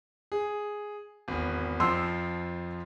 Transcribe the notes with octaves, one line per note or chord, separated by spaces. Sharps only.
G#4
G#1 E2
F2 F3 C6 E6